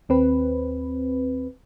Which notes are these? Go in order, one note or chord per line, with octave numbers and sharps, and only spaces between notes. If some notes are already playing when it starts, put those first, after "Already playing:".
D#2 C4 B4